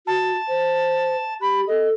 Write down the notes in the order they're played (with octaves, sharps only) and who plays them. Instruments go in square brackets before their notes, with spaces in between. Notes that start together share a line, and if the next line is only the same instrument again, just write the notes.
[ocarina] F#4 [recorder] A5
[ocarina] C5
[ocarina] G4 [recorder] B5
[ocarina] A4 [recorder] D#5